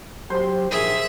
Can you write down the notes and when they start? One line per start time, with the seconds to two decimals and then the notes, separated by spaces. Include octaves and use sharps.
0.30 F#3 G4 C5 C6
0.71 A#1 D#3 G#4 E5